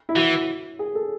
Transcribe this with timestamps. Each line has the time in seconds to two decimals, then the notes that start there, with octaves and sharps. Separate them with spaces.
0.09 E4
0.16 E3 F#4
0.79 G#4
0.95 A4